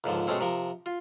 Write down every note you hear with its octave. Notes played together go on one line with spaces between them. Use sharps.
C#2 G#2 D3 F3
B2 G#3 A3 C4 C#4
C3 F3 A#4
F4